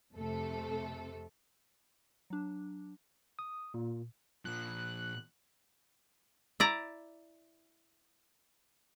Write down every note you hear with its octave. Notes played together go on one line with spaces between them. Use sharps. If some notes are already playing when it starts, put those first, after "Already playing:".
F2 C3 A3 A4
F#3 D4
D#6
A#2
A#2 F3 F#6
E4 D5 A#5